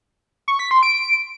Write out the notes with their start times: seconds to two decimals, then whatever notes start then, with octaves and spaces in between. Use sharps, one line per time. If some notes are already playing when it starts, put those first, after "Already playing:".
0.48 C#6
0.59 B6
0.71 C6
0.83 D7